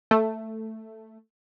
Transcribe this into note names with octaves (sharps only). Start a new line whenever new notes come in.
A3